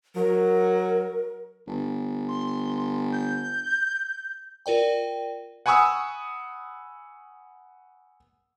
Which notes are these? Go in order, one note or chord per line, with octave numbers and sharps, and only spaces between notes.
F#3 A#4
G1
C6
G6
F4 A#4 D5 G5
F#5 G#5 B5 C#6 D#6 E6